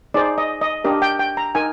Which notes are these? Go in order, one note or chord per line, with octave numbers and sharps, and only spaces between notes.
D#4 G#4 C5 D5
D#5
D#5
D4 G4 A#4 D#5
G5
G5
A#5
D#4 A#4 G#5